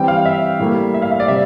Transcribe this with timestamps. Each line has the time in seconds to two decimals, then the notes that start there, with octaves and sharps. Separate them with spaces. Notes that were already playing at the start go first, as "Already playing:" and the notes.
Already playing: E3 G3 C4 G5
0.08 F5
0.26 E5
0.59 A2 G3 A#3
0.94 E5
1.02 F5
1.11 E5
1.20 D5
1.28 C3 G3 E5